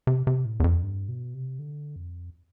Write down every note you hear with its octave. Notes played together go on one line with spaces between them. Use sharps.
C3
C3
A2
E2
F2
G2
B2
C3
D3
F2